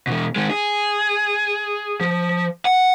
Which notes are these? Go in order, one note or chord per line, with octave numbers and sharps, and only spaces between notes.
B2 E3
D#3 G#3
G#4
F3
F#5